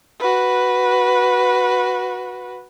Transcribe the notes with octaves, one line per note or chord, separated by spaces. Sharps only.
F#4 B4